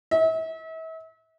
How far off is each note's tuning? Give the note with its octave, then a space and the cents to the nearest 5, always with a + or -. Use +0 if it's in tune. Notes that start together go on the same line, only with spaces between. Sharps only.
E5 -40